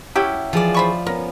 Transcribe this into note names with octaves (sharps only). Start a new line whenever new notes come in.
F#3 C#4 E4 G4
E3 F3 G#4 D5
C5 B5 C#6
B3 C#4 A#4